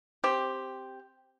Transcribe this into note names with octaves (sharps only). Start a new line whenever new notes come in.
C4 G4